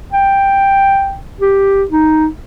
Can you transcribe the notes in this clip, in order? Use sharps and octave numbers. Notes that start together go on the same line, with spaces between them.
G5
G4
D#4